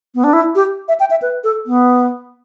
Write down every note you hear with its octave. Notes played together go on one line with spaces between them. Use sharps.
B3
D4
E4
G4
E5
G5
E5
B4
A4
B3